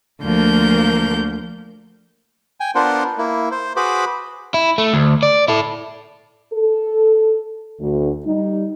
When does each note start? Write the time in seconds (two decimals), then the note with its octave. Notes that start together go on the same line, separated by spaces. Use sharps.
0.22 D2 F3 A#3 A#4 G6
2.60 G5 G#5
2.75 B3 D4 F4 A#4 C5 F#5
3.18 A#3 E4
3.51 C5
3.76 F#4 G#4 B4 C5 B5 D6
4.54 E4
4.78 A3
4.94 D2
5.23 D5
5.48 E4 A4
6.53 A4
7.81 D2
8.25 G3 D#4